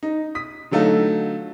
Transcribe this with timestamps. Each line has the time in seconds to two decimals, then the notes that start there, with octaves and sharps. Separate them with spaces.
0.03 D#4
0.35 D#6 B6
0.71 D3 F#3 A3 D#4 F4 A4